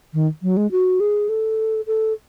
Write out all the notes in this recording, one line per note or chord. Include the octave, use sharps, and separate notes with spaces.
D#3
F#3
G#3
F#4
G#4
A4
A4